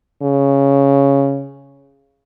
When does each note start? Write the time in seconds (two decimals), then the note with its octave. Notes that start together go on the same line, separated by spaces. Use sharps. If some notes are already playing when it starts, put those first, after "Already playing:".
0.22 C#3